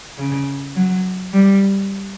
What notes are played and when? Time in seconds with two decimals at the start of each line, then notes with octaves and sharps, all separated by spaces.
0.19 C#3
0.76 F#3
1.33 G3